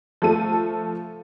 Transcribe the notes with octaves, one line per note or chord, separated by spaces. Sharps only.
F3 A3 A4 D#7